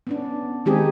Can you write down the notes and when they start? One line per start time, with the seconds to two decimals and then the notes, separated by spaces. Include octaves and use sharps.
0.07 B3 C#4 D4
0.66 D#3 G#3 C4 D#4 G4 G#4